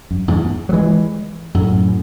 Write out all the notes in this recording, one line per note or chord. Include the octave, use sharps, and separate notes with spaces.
F#2
E2 G#2
F#3
E3 G#3
F#2 A2